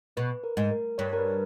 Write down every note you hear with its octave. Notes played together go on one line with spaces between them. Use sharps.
B2 B4
A#4
G#2
A#4
G2 C#5
A#4
B4